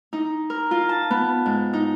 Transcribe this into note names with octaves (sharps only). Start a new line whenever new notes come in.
D#4
A#4
F4
A5
B3
G#2
D#4